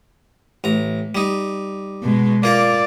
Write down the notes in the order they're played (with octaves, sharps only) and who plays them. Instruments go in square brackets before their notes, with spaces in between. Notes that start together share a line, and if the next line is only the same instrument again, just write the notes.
[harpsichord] A1 A#5
G3 D#4
[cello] B2 G#3
[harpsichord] A#3 F4 A#4 [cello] D5